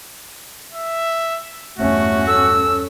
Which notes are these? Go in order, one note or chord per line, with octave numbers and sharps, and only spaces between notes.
E5
E2 G2 A3 C#4 F#4
A4 E6